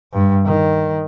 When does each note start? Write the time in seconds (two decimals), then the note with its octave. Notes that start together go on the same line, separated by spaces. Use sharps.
0.13 G2
0.46 D#3